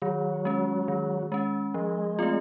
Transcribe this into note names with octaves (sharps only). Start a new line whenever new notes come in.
D#3 F#3
G#3 C#4
D#3
G#3 C#4
F3 G#3
A3 C4 F4